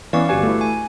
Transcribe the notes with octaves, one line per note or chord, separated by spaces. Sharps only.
E3 B3 C#4 D5 F5 C#6
G1 F#4 G4 B4 G#5
A3 E4
G#5